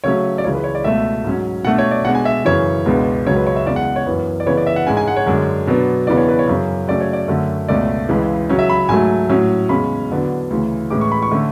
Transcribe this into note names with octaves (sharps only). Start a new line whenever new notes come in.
C#3 F#3 A3 C#4 C#5
D5
C#2 C#3 E3 G#3 C#5
B4
C#5
D5
C#2 B2 A3 E5
G#2 F#3 C#4
B2 A3 D4 F#5
C#5
D5
B2 G#3 D4 F#5
G#5
E5
F#2 C#3 E3 C#5
C#2 B2 G#3 B3 D4
C#2 C#3 F#3 C#4 C#5
B4
C#5
E5
E2 C#3 G#3 D5
F#5
C#5
F#2 E3 B3
D5
C#3 E3 B3 C#5
D5
E5
F#5
G#2 G#3 C#4 G#5
G#5
F#5
C#5
F#2 D3 G#3 D4
B2 F#3 B3 D4
E2 C#3 E3 B3 D4 D5
C#5
B4
C#5
F#2 C#3 F#3
C#3 F#3 A3 C#4 D5
C#5
D5
F#2 D3 A3 C#4
C#2 B2 A3 C#4 D5
C#2 C#3 E3 G#3
C#3 F#3 C#4
E5
B5
G#2 F#3 A3 G#5
A2 F#3 C#4
E2 C#3 G#3 C#4 B5
E2 D3 F#3 B3 D4
D2 C#3 E3
A2 E3 G#3 C#4 D6
C#6
B5
C#6
D3 A3 C#4